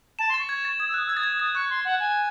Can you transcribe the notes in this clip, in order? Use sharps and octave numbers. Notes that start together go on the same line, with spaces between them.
A5 E7
C6
A6
C#6
G#6
A6
D#6 G#6
E6
F#6
D#6
E6 G#6
D#6 A6
G#6
D#6 A6
C#6 F#6
C6
F#5
G#5